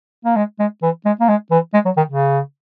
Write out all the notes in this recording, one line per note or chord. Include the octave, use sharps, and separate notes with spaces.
A#3
G#3
G#3
E3
G#3
A#3
G#3
E3
G#3
F#3
D#3
C#3